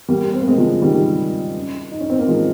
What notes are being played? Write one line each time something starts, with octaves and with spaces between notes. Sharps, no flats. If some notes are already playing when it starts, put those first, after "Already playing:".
G3 A#3
C4
A#3
G#3 C4
C#3 F3
D#3 G3
D#4
C#4
C4
A#3
F3 G#3